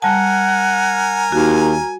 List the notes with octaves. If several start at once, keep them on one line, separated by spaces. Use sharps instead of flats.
G3 A#4 F#5 G#5 A5
D#2 F#4